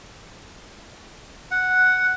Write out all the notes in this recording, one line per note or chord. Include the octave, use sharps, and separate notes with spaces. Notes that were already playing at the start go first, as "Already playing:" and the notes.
F#5